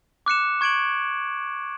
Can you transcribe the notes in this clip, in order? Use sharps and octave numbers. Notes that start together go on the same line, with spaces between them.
D6 F#6 C#7 E7
C#6 G#6 D7 F#7